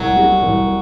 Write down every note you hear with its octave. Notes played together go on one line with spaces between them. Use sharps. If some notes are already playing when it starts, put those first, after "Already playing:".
Already playing: C2 F#3
G3
C2